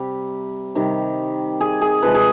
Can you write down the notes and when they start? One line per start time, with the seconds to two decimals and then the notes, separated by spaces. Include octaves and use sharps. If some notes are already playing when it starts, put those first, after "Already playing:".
Already playing: C3 G3
0.75 C3 D#3 G3
1.61 G#4
1.81 G#4
2.03 C3 F3 G#3 B4
2.15 G#4